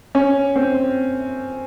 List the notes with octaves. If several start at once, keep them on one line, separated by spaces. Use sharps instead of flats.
C#4
C4